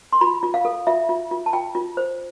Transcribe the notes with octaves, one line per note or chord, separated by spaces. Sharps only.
C6
F4 B5
F4
F5
A4
F4 E5
F4
F4
A5
F4 G5
F4
C5